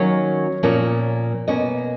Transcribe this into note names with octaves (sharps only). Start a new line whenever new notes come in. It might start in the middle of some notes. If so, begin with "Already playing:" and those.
Already playing: D#3 F#3 A#3 C#4 C#5
A#2 F3 A#3 C#4
B2 A#3 C#4 D#5